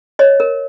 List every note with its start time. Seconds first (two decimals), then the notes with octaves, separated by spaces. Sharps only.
0.19 C#5 D#5
0.40 A#4